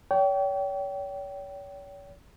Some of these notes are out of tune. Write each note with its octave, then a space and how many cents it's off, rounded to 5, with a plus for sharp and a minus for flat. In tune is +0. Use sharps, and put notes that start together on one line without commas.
C#5 +40 G5 -20